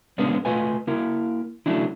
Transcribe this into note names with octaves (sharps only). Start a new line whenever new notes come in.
G#3 A#3 B3 C#4 D4
A3 F4 B4 D#5 G#5
A#3 E4 A#4
F#3 A3 C#4 D4 E4